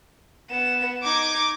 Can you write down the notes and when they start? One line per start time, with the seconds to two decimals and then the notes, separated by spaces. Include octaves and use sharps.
0.50 B3 E7
1.04 D#4 D6 G#6